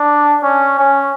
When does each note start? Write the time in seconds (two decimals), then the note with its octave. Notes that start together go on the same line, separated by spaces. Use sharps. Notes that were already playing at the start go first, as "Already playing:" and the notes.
Already playing: D4
0.43 C#4
0.79 C#4